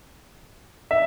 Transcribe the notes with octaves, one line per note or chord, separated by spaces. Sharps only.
E5